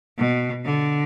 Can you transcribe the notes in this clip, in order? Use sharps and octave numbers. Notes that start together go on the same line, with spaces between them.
B2
D3